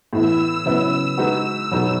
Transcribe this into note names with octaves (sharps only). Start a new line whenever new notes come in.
A2 E3 B3 E4 E6
C#3 F#3 B3 E4 B4
G#3 D#4 F#4 B4
B2 F#3 B3 D#4 G#4